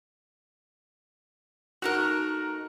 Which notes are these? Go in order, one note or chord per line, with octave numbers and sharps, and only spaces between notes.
A3 D#4 F#4 A#4 F#6